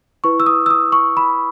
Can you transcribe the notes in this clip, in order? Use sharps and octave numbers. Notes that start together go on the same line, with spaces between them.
E4 B4 C#6
E6
D#6
E6
D#6
C#6
B5